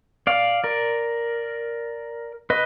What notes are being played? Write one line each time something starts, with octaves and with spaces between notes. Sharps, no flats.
D5 F5
A#4 D5
B4 D#5